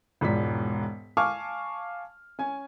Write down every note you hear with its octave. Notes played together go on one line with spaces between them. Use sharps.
E1 G#2 F3 D5 B6
F5 G#5 A5 C#6 D6 F6
C#4 G#5